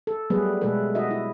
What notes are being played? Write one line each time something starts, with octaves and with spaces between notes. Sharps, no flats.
A4
F#3 G3 A3 B3 G#4 B4
B2 G#3 A3 A4 B4
F#4 D#5 E5
E4